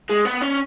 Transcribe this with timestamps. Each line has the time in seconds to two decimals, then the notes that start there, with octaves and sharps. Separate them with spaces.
0.09 G#3
0.25 B3
0.42 C#4